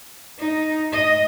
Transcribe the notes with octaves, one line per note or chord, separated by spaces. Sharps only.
D#4
D#5